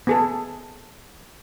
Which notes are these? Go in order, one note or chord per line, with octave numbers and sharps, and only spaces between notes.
B3 G#4 A4